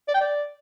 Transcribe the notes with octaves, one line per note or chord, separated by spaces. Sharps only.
D5
G5
D5